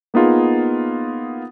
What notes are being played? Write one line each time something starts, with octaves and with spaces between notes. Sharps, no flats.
A#3 B3 D#4 F4 G#4